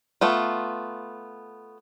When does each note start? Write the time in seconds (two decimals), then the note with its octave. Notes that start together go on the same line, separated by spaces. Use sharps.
0.21 A3 B3 F4